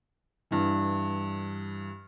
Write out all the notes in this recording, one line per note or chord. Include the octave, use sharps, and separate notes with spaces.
G2 E3